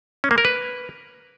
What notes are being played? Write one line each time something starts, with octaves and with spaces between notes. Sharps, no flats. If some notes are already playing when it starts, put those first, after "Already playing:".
C#4
A#3
A#4
B4